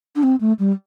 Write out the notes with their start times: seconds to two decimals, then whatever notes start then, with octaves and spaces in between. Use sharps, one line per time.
0.16 D4
0.23 C4
0.40 A3
0.59 G3